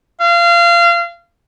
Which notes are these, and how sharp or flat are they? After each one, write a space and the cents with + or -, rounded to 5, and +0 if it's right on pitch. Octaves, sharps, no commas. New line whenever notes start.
F5 -25